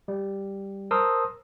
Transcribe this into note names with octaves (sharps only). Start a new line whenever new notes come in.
G3
A#4 C5 A5 C6 D#6 E6